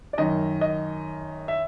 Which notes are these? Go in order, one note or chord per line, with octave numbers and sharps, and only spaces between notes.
D5
F#2 D#3 D#5
D#5
E5